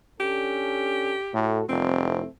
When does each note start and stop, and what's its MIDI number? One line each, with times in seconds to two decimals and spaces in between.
0.20 1.16 61
0.20 1.16 62
0.20 1.39 67
0.20 1.16 69
1.34 1.61 45
1.34 1.67 57
1.34 1.67 66
1.34 1.67 69
1.69 2.22 29
1.69 2.02 40
1.69 2.02 55
1.69 2.28 60
1.69 2.02 65
2.05 2.26 57
2.05 2.26 64